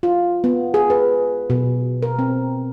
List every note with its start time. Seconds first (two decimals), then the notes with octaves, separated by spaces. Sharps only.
0.03 F4
0.44 B3
0.74 G#4
0.90 B4
1.50 B2
2.03 A#4
2.19 C4